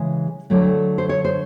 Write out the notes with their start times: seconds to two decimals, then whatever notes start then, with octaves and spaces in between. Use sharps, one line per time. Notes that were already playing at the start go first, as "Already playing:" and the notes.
Already playing: C#3 E3 G#3
0.50 D3 F#3 A3
0.98 C5
1.09 C#5
1.25 C5